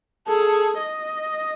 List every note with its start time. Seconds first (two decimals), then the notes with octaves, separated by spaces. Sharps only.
0.28 G#4 A4
0.78 D#5